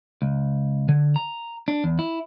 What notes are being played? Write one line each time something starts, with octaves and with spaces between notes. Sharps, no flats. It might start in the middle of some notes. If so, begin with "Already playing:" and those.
C#2
D3
A#5
D4
E2
E4